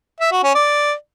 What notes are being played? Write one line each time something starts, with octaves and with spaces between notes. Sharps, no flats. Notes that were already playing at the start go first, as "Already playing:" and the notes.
E5
F#4
C#4
D5